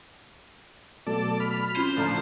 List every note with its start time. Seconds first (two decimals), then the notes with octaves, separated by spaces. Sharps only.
1.07 B2 F#3 A3 A4 D5
1.40 B5 F6
1.76 C4 C#4 F4 C5
1.97 A2 D3 F3 A#5 F6 G6